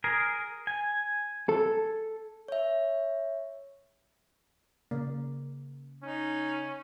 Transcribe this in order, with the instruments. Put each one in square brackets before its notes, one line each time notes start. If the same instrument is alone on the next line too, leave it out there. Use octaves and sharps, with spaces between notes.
[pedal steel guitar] G#4 A#4
G#5
[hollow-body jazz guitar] A4
[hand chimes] C#5 E5
[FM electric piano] C#3 [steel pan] A#3
[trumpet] C#4 [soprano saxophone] D#4